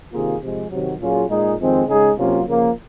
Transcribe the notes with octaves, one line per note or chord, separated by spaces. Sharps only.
C3 D#3 A#3 F4 G#4
C3 F3 G#3
C3 D#3 F#3
A#2 F#3 C#4 F4 G#4
A#2 G#3 D#4 G#4
F2 D#3 G#3 C4
C#3 G#3 D#4 G#4
C3 F#3 A#3 C#4 F4
C#3 F3 A#3